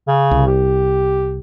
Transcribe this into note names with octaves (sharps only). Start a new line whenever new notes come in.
C#3
C2
G4